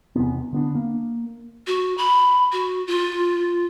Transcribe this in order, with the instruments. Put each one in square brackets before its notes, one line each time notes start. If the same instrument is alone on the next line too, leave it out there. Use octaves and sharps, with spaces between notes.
[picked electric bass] E2 C3 B3
D3 B3 D4
A#3
[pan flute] F#4
B5
F#4
F4